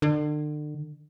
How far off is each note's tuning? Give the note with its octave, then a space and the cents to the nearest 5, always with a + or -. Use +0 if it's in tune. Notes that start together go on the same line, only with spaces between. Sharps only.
D3 +35